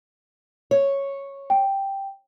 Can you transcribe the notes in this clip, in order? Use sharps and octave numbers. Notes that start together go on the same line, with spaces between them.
C#5
G5